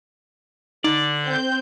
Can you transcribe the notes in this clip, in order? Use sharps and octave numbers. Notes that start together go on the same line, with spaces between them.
D3 D#4 D5
C4 G6